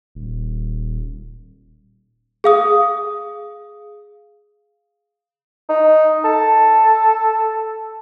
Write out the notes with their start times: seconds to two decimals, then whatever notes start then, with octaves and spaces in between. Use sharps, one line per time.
0.15 D#1
2.44 G#4 F5 D#6
5.69 D#4
6.24 A4